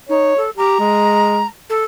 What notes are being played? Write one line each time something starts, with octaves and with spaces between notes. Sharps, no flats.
D#4 C#5
A4
G4 A#5
G#3
A4